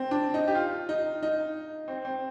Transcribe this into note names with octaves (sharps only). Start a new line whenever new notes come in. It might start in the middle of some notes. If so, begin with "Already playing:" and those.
Already playing: C4
D4
D#4
G4
F4
D#4
D#4
C4
C4